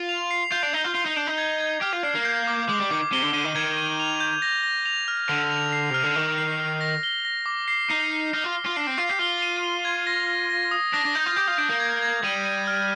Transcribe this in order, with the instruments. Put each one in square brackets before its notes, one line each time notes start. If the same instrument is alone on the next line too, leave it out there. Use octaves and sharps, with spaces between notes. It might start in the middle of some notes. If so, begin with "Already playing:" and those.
Already playing: [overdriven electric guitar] F4
[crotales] F7
C7
[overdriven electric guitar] F4 [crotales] G6
[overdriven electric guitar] D4
[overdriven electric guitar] D#4 [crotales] G7
[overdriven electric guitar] F4
[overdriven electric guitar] F4 [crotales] C7
[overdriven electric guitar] D#4
[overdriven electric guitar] D4 [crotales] G6
[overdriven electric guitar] D#4
[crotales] G#6
G#6
[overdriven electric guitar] G4 [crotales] F6
[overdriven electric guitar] F4
[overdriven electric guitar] D4 [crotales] C7
[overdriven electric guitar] A#3
[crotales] G6
D6
[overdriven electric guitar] G#3 [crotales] D6
[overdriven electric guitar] G3
[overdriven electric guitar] D#3 [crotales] D6
[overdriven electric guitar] C3 [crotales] G7
[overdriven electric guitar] D3
[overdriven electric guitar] D3 [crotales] D#7
[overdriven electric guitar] D#3
[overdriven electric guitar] D#3 [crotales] G#6
[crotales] D#7
F7
G6
A#6
A#6
F7
F6
[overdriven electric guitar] D3 [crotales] F6
[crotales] F7
C7
[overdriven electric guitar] C3 [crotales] F6
[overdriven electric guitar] D3
[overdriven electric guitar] D#3 [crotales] F6
[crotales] C7
F6
A#6
G7
A#6
D6
C7
[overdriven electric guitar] D#4 [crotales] C7
[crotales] C7
[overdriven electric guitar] D#4 [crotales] F6
[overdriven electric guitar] F4
[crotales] G7
[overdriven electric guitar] F4
[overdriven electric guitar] D4 [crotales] C7
[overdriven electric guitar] C4
[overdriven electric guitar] F4 [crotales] C7
[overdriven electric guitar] G4
[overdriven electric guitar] F4 [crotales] G7
[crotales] D#7
G7
G#6
A#6
A#6
A#6
D#6
[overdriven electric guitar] D4 [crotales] A#6
[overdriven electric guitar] D4
[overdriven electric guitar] D#4 [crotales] G6
[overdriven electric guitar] F4
[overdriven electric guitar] G4 [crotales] G6
[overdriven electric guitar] F4
[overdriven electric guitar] D4 [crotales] G6
[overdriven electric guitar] A#3
[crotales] G#6
G#6
[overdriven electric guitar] G3 [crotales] D#7
[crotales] D#7
F6